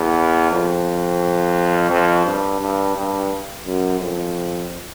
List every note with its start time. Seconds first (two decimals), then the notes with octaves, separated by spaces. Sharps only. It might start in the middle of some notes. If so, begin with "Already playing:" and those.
Already playing: E2
0.51 F2
1.90 F2
2.25 G2
2.61 G2
2.95 G2
3.65 F#2
4.00 F2